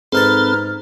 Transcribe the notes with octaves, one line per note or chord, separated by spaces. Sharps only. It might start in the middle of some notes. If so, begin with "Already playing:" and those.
G#2 C4 D#4 A4 B4 A5 A#5 F6